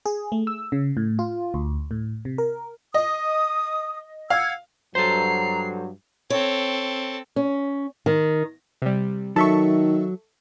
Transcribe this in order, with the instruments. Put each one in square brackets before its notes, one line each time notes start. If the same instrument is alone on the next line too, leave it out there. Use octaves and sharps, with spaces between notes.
[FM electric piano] G#4
A3
E6
C#3
A2
F4
D2
A2
C3
A#4
[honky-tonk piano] D#5 [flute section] D#6
[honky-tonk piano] F5 [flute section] F#5 E6 G#6
[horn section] G2 F#3 [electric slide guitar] A4 C5 [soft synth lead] A#5 [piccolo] C7
[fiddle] C4 A4 [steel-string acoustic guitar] C#5
[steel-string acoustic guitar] C#4
[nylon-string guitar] D#3
[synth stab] C3 G3
[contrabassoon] D#3 [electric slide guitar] F#3 [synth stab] A4 E5 C#6